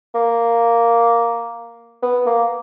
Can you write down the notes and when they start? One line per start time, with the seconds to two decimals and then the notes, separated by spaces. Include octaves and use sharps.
0.15 A#3
2.02 B3
2.26 A#3